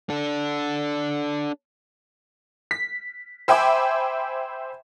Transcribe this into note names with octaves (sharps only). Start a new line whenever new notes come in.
D4 A4
B6
C5 E5 G5 G#5 B5 D6